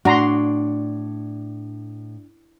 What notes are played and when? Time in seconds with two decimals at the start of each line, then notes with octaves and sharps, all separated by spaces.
0.05 A2 D4 F#4 A#5 C6